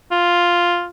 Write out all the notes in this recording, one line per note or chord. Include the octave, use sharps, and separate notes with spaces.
F4